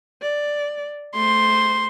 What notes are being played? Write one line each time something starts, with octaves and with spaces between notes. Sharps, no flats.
D5
A3 C5 C6